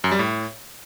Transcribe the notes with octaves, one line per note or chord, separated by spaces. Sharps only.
F#2
G3
A2